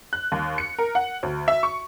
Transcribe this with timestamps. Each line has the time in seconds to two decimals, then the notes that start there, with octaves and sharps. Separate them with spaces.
0.13 F#6
0.32 D#2
0.58 C#7
0.78 A#4
0.95 F#5
1.23 D2
1.48 E5
1.63 C#6